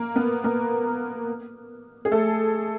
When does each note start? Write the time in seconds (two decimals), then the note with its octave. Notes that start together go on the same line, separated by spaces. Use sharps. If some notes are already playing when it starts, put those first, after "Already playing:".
Already playing: A#3 A#4
0.16 B3 B4
0.44 A#3 A#4
2.05 G#4
2.11 A3 A4